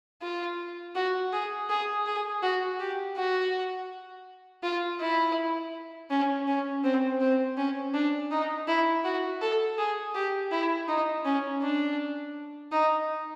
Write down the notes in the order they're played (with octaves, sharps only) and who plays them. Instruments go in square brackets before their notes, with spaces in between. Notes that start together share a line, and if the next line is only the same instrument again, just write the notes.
[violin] F4
F#4
G#4
G#4
G#4
F#4
G4
F#4
F4
E4
C#4
C#4
C4
C4
C#4
D4
D#4
E4
F#4
A4
G#4
G4
E4
D#4
C#4
D4
D#4